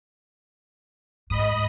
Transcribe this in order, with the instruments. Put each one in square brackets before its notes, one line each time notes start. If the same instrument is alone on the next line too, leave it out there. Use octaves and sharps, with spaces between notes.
[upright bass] G#2 [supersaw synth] D#5 B5 D#6